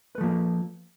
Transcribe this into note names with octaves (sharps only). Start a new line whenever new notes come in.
F3 A3 A#3 B4